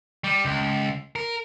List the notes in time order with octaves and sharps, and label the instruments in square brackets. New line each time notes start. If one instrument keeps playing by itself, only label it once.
[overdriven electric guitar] G3
C#2
A#4